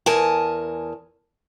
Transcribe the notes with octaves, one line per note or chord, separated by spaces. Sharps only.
E2 A#4 G#5 A5